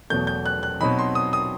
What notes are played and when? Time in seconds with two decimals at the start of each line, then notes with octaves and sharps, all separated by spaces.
0.10 E2 B2 F#3 A3 G6
0.27 G6
0.46 F#6
0.63 F#6
0.81 B2 F#3 C4 D#4 B5
0.99 C6
1.15 D#6
1.33 D#6